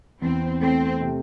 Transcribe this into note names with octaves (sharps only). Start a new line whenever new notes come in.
E2 C4
A3 C4
C3